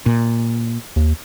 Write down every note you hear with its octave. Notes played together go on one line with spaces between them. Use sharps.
A#2
D#2